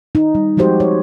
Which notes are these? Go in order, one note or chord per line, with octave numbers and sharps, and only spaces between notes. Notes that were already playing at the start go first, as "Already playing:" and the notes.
D#4
G3
F3 G#3 F#4 G4 C5
C#5